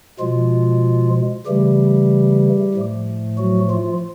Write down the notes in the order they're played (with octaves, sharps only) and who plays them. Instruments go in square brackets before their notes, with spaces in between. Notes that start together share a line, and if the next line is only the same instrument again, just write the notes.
[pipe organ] B2 F3 G#3 F4
C#3 E3 G3 A3 G4
A2 F3 A3
F#3 F#4
F3 F4